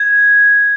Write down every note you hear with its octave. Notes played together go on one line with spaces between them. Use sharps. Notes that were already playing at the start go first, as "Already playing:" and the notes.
Already playing: G#6